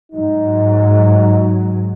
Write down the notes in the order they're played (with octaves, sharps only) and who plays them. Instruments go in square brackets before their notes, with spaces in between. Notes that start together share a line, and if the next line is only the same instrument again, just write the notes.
[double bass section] G#2 F#3 [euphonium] D#4